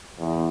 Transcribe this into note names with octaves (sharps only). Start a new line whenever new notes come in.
E2